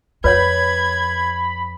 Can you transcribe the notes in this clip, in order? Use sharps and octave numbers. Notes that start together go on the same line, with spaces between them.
F2 B4 C#5 F#5 B5 G#6